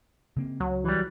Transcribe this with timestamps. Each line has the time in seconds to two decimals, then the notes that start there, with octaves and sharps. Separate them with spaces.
0.37 C#3 A#3 C4
0.60 C#2 F#3
0.84 E3 G3